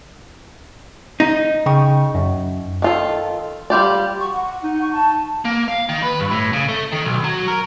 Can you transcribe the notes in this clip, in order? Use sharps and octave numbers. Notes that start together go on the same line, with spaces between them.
D#4
C#3 G5 C#6
F#2
D#3 F4 A4
G3 F4 G4 D5
F#4 C#6
F#5
D#4
C#6
A5
A#3
F5
D#3
B4
G2
A2
C#3
A3
D#3
B1
F#3
A#4